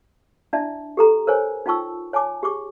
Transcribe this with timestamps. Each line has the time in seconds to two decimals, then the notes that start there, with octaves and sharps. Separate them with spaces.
0.53 D4 E4 D5 E5 A5
0.97 G4 A4 A#5
1.27 A#4 C5 C#5 G#5
1.66 D#4 F4 G5 A5 C#6 E6
2.13 C#5 G#5 A5 D6
2.43 G4 G#4 C#6 D6